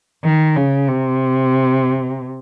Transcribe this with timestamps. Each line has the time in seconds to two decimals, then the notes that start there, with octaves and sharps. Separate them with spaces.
0.24 D#3
0.56 C#3
0.88 C3